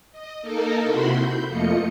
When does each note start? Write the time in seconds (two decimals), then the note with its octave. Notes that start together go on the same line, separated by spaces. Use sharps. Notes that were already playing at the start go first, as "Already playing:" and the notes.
0.12 D#5
0.42 A#3 D#4 A4 A#4
0.84 C3 E4 F#4 B5 C6
1.14 G6
1.48 F2 A3 A#3 F4 D#5 C#7